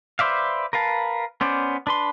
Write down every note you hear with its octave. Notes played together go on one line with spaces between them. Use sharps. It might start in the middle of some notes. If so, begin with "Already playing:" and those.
B4 C5 D5 E5 F5
A#4 B4 F5 A5
B3 C#4 C5 D5
D4 B4 C6